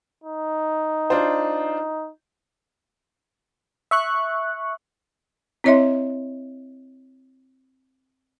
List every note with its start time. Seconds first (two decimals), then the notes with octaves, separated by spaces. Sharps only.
0.24 D#4
1.10 D4 F4 C5
3.91 E5 C#6 F#6
5.64 C4 E4 C#5 D#5 E5 C6